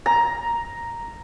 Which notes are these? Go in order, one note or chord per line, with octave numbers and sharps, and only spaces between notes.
A#5